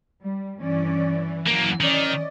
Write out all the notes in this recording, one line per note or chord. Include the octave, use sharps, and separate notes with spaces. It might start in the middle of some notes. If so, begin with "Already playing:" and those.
G3
G2 E3 C#4 D5
F#2 F#3 A#3
D#3 C#4 D5 D#5